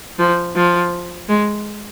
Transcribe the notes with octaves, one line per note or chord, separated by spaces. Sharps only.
F3
F3
G#3